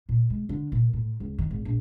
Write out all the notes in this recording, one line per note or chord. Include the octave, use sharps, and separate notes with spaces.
A#2
G#3
D3
A#2
A2
C#2
D#3
G#1
A#1